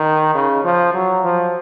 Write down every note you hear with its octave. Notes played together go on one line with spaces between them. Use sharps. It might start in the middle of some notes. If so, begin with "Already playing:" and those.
Already playing: D#3
C#3
F3
F#3
F3